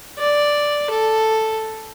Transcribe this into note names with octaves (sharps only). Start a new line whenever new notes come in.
D5
A4